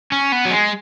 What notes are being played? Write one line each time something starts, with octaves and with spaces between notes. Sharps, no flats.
C#4
B3
F#3
G#3